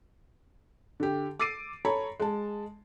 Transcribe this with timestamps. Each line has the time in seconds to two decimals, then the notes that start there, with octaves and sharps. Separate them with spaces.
1.00 D3 G4
1.40 D6 E6 A6 C7 D7 D#7
1.85 A4 C#5 A#5 B5
2.20 G#3 A5